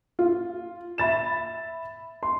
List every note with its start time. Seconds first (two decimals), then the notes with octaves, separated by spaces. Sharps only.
0.19 F4
0.98 E5 B5 A6 E7
2.23 C6